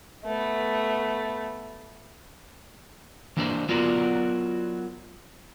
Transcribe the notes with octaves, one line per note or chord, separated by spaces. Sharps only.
A3 B3
E3 A#3 D4 C5 D5
F#3 B3 F4 F#4 A#4 D5